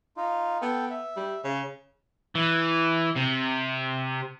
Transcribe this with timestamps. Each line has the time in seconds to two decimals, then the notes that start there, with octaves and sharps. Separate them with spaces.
0.17 D#4 F4
0.62 B3 A4 G5
0.91 E5
1.16 G3
1.44 C#3
2.35 E3
3.15 C3